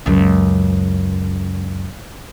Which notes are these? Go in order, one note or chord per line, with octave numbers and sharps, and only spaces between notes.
C#2 F#2